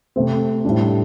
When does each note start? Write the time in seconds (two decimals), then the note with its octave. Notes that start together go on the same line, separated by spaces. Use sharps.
0.16 C3 A3 C4
0.65 A2 G3 D4